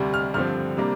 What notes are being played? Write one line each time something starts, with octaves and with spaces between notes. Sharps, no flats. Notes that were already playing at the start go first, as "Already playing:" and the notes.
Already playing: D2 C3 G3
F6
G2 D3 F3 C4 F6
C3 G3 A#3 D4